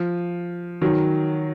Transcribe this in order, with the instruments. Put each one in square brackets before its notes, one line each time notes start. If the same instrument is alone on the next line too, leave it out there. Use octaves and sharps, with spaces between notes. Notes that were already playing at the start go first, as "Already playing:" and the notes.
Already playing: [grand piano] F3
D#3 F#3